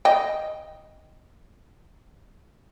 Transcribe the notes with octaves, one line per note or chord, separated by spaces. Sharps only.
D#5 G5